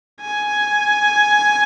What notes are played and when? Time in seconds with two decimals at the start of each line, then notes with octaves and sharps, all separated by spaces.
0.21 G#5